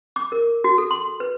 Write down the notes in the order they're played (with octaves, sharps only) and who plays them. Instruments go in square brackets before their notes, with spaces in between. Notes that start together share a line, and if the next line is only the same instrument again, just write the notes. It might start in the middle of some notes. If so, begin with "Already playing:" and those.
[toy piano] D6
A#4
F#4
A4
C6
B4